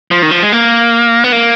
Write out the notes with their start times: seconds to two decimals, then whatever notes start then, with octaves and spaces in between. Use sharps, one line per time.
0.11 F3
0.22 D#3
0.31 F3
0.42 G#3
0.52 A#3
1.24 B3
1.32 A#3